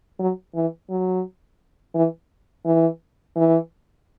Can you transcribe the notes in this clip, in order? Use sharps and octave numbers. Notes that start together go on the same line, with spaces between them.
F#3
E3
F#3
E3
E3
E3